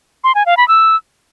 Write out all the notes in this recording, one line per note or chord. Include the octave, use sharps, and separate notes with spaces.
C6
G#5
F5
B5
E6